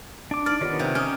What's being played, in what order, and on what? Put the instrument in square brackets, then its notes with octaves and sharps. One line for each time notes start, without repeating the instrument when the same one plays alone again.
[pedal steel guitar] D4 D6
[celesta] D#4 F6 [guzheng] D5
[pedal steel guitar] D#3 B3 [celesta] F4 G4 C#5
[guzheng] C3
[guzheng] C#4 [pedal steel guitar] G4 A#4 [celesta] D#6 F6